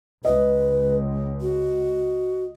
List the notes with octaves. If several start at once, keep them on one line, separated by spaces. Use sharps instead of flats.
C#2 B4 D#5
F#4